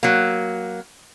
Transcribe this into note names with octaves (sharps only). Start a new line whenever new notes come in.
F#3 A#3